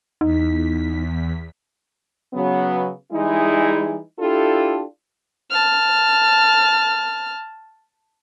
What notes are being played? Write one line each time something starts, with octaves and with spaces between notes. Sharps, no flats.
E2 D#4 B6
C#3 F#3 B3
E3 G3 G#3 D#4 E4 G#4
D4 E4 F4 G4 A4
A5 F6